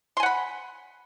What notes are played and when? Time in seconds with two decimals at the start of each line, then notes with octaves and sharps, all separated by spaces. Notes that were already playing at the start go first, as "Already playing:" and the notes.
0.17 C6
0.20 G#5
0.23 F#5
0.26 B5